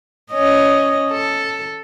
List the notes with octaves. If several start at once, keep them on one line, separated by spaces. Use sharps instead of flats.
C#4 D#5
A4